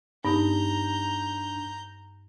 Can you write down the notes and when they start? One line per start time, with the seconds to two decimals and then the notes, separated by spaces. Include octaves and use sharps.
0.25 G2 B3 D4 D#4 A#5 G6